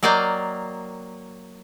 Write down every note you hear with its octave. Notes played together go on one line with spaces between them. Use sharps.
F#3 A#3 D5 D#5 F5 G5